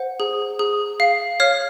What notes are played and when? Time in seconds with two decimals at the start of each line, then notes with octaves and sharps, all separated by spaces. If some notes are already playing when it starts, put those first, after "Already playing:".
Already playing: C5 F#5
0.20 G#4
0.59 G#4
1.00 F5
1.40 C#5 F5 F6